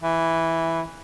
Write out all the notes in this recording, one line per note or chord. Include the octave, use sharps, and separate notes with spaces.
E3